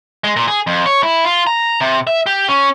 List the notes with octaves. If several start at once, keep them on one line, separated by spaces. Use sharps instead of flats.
G#3
A#2
G#4
F2
C#5
E4
F4
A#5
C3
E5
G4
C#4